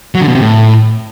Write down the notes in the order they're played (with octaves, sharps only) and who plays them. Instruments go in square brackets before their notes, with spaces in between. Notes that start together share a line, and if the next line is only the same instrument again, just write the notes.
[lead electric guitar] F#3
D3
B2
C3
A2